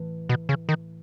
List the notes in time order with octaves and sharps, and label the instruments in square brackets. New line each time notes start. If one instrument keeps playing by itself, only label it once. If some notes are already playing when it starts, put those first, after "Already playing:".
Already playing: [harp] A2 E3 A3
[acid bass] B2
C#3
D#3